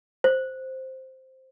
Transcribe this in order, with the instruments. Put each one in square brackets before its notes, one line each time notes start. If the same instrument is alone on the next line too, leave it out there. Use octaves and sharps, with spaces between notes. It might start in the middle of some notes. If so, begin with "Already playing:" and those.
[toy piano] C5